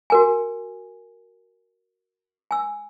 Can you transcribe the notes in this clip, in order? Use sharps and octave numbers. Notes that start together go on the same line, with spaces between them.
F#4 A#4 G#5
G#5 E6